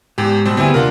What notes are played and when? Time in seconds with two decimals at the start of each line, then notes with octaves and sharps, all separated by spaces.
0.18 E2 G#2 G4
0.45 B2 G3 C4
0.57 D2 G3 B3 C4 E4 G#4
0.74 D#2 C3 D4 F4 A#4 F#5